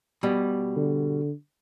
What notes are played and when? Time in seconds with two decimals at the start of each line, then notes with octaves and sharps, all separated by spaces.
0.23 B2 G3
0.76 D3